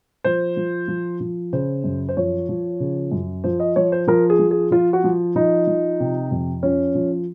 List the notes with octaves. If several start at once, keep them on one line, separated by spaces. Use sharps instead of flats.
F3 C5
F3
F3
F3
C#3 C5
F#2
C5
F3 C#5
F3
C#3
F#2
F3 C5
D#5
F3 C#5
C5
F3 A#4
G#4
F3
G#4
F3 F4
F#4
F3
F3 D#4
F3
C3
F2
F3 C#4
F3